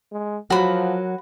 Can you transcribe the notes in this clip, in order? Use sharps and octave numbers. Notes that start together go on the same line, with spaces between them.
G#3
F3 F#3 F#4 A#4 B5